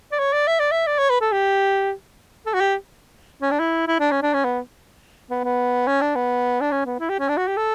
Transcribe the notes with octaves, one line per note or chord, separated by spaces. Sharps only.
D5
C#5
D5
E5
D5
E5
D5
C#5
B4
A4
G4
A4
F#4
G4
C#4
D4
E4
E4
D4
C#4
D4
C#4
B3
B3
B3
C#4
D4
B3
D4
C#4
B3
E4
G4
C#4
D4
F#4
G4
A4